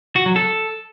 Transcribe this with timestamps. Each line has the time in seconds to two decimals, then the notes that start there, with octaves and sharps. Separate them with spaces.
0.16 F#4
0.26 F#3
0.36 A4